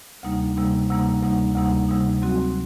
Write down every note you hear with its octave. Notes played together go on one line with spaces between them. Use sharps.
D2 C3 G3 A#3 D#4
D2 C3 G3 A#3 D#4
D2 C3 G3 A#3 D#4
D2 C3 G3 A#3 D#4
D2 C3 G3 A#3 D#4
D2 C3 G3 A#3 D#4
F#3 C4 F#4